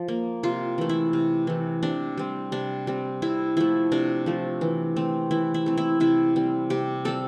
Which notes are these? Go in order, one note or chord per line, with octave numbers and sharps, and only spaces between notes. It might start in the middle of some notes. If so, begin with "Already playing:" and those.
Already playing: F3
A#3
C3 F4
E3 A3
E4
C3
E3 A3
C3 D4
G3 C4
C3 D4
G3 C4
C3 E4
F3 A3 E4
C3 D4
F3 A3
E3
A3 C4
E3 E4
E4
A3 C4
E4
C3 E4
G3 C4
C3 G4
G3 C4 A4